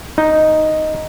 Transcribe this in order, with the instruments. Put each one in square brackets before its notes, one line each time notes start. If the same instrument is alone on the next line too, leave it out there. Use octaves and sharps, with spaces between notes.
[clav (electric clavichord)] D#4